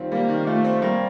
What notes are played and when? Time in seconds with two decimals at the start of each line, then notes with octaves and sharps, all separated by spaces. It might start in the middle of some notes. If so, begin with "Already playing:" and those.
Already playing: D#3 G3 C4 F4
0.11 G3 A#3
0.29 D#3
0.47 A3 F4
0.64 C4
0.82 G3 A#3